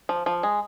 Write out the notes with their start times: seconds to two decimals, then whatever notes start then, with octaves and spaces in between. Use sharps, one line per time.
0.09 F3
0.26 F3
0.43 G#3